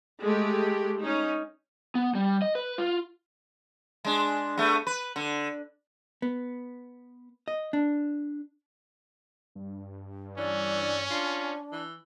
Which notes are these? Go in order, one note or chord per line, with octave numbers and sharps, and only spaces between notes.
G#3 A3 G4
C#4 D#4
B3
G3
D#5
B4
F4
G#3 D4
A3 B3
B4
D3
B3
D#5
D4
G2
E3 C#4 D5
D4 F4
E3